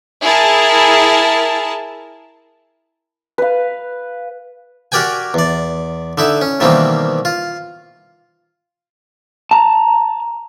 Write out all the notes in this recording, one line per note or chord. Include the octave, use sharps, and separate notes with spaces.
E4 G#4 A#4 A5
B4 F5
F#4 G4 A#4 D5 G5 G#5
E2 D5
D3 D#4 E4
C#4
B2 D#3 E3 G3 A#3 C4
F4
A5 A#5